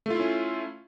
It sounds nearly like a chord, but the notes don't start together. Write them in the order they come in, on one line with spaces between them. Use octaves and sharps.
A3 F4 E4 C#4